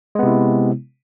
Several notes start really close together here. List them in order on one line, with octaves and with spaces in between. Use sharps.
G#3 B3 C3 E4